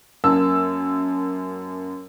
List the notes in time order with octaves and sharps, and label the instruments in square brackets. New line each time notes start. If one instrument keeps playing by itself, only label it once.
[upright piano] F#2 A#3 A5 E6